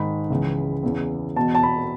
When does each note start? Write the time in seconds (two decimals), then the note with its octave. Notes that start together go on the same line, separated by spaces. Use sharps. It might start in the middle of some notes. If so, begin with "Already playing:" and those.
Already playing: G#2 D#3 B5
0.30 C#2 C#3 E3
0.83 E2 C#3 E3
1.36 E2 B2 A5
1.55 A5
1.63 B5